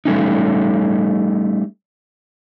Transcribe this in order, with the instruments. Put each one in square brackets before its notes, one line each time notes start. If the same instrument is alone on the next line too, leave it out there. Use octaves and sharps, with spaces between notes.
[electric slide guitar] G3 A3 C#4 D#4